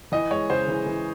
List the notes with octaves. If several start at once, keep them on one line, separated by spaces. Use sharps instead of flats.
E3 D#5
G#3 C#5
C#3 C5
E3
E3